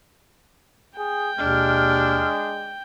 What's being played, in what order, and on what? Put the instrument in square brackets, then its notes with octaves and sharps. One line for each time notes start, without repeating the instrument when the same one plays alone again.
[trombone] G#4 [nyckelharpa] G5
[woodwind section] D#2 B2 F6 [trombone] G#3 [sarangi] D4